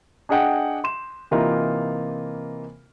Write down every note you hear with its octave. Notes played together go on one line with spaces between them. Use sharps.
D4 G#4 D#5 F#5 G5
C6 E7
C3 E3 A#3 D#4 F4 A#4